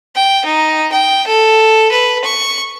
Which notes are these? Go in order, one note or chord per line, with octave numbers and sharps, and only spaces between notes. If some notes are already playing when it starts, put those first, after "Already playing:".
G5
D#4
G5
A4
B4
C#6